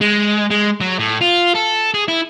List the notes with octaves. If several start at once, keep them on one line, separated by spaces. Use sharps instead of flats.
G#3
G#3
F#3
A2
F4
A4
G#4
E4